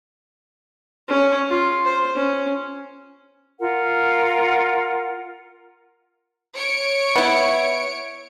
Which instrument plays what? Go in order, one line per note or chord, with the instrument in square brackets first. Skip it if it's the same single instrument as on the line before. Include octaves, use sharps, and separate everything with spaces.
[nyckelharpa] C#4 C#5
F4
C5
C#4
[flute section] F4 A#4 F#5
[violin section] C#5 C#7 D7
[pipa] B3 E4